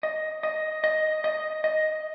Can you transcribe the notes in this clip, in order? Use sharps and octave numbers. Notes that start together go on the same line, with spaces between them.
D#5
D#5
D#5
D#5
D#5